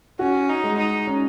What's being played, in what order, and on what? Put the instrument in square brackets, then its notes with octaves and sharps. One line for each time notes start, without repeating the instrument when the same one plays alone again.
[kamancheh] C#4 [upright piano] F#4
[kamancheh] D#4
[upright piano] G#3
[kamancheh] D#4
[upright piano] C#4